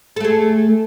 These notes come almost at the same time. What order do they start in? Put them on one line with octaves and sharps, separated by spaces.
A4 A3 G#4